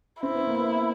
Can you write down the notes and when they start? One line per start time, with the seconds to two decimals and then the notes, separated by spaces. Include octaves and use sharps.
0.22 C4 E4
0.35 B3
0.47 A#3
0.60 B3